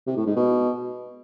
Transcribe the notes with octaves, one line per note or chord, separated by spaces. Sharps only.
C3
A2
G#2
B2